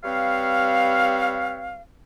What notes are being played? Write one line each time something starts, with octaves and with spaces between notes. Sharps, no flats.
G3 C4 B4 C#5 F5